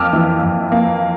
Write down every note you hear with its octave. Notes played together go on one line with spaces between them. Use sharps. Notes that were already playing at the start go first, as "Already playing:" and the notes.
Already playing: F2 A#3 D6 E6 F6
E3
F2
A#3